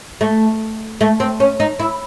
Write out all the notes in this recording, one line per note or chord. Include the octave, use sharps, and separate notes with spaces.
A3
A3
C4
C#4
D#4
E4